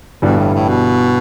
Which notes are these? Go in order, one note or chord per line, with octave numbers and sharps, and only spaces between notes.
G1 G2 B2 E3 G3
A2
A2
B2